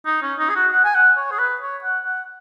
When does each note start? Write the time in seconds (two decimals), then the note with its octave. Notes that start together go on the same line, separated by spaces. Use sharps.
0.06 D#4
0.22 C#4
0.39 D#4
0.50 G#4
0.56 F#4
0.72 F#5
0.84 G#5
0.95 F#5
1.17 C#5
1.31 G#4
1.39 B4
1.61 C#5
1.84 F#5
2.05 F#5